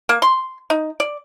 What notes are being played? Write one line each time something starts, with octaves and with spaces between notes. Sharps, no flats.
A#3
C6
D#4
D5